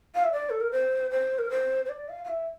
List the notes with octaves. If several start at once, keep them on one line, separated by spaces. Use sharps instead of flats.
F5
E5
D5
A4
A#4
C5
C5
A#4
C5
C5
D5
F5
F5
E5